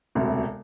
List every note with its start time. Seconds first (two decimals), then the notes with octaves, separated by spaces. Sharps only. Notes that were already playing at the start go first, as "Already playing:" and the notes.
0.15 E1 D2 C3